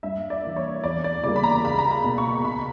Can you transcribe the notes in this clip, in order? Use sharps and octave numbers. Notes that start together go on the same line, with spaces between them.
G2 E5
D5
E3 A#3
C#5
E2 D5
D5
C#3 G3 A#3 D5
B5
A#5
C#2 B5
A#5
B5
B2 A#3
C#6
C#2 B5